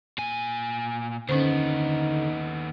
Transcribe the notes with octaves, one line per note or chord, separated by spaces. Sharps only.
A#2 G#5
D#2 D3 B3 C#4 D#4 C5